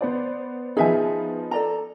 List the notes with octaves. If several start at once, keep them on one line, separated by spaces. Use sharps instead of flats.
B3 C5 D5
F3 B3 D#4 G#4 E5 G#5
A4 D5 A#5